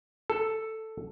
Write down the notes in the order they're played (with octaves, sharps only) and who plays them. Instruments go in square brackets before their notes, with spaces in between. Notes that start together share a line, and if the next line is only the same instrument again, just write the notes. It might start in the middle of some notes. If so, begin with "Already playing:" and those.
[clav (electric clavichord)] A4